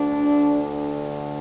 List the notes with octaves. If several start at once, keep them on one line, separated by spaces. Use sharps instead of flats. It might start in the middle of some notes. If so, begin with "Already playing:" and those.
Already playing: D2 D3 D4